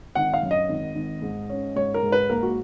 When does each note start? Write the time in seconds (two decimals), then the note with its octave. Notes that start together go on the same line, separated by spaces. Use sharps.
0.15 G#1 F#5
0.34 F5
0.43 F#2
0.51 D#5
0.69 G#1
0.95 G#1
1.22 G#2
1.50 C#4
1.76 G#2 C#5
1.94 A#4
2.03 G#2
2.12 B4
2.30 A#3 A#4
2.43 F#4